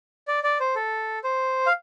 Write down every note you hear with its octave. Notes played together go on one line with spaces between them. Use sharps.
D5
D5
C5
A4
C5
F5